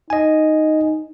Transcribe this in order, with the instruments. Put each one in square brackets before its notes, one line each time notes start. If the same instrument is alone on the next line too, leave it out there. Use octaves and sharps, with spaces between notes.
[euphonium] D#4 [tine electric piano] D#5 G#5